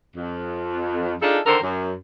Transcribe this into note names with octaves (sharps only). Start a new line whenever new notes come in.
F2
D4 D#4 F4 G#4 A4
D3 D#3 A4 A#4 C5
F#2